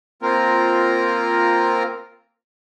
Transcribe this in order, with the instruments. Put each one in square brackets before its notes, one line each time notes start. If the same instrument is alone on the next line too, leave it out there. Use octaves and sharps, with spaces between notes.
[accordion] A#3 C4 F4 A#4